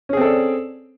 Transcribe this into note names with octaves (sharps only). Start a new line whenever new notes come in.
C4 C#4 G#4 A4 D5